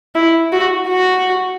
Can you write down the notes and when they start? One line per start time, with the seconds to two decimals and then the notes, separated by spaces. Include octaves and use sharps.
0.15 E4
0.52 F#4
0.88 F#4